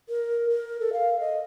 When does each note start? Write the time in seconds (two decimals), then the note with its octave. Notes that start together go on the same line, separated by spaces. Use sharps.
0.09 A#4
0.50 A#4
0.80 A4
0.93 F5
1.20 D#5